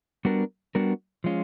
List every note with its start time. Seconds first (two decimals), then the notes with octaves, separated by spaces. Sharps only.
0.25 G3 B3 D4 F#4 A#4
0.75 G3 B3 D4 F#4 A#4
1.24 F3 G#3 C#4 F4